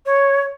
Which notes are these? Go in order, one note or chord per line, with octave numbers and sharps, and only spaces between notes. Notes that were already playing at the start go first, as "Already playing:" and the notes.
C#5